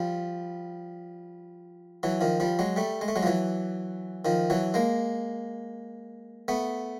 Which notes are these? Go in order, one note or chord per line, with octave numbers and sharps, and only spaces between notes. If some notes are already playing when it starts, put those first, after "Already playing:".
Already playing: F3 G3
E3 F#3
D#3 F3
F3 G3
F#3 G#3
G3 A3
G#3
A3
F#3 G#3
F3
E3 F#3
D#3 F3
E3 F#3
G#3 A#3
A3 B3